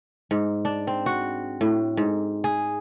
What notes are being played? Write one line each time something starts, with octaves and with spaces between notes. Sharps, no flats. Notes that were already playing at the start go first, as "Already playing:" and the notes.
G#2
D4
C4
F#4
A2
G#2
G#4